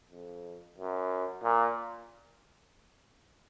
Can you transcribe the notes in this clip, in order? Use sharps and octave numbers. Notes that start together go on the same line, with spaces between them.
F2
F#2
A#2